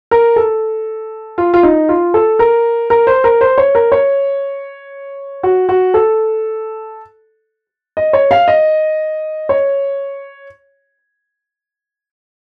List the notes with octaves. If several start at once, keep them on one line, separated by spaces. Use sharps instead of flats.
A#4
A4
F4
F4
D#4
F4
A4
A#4
A#4
C5
A#4
C5
C#5
A#4
C#5
F#4
F#4
A4
D#5
C#5
F5
D#5
C#5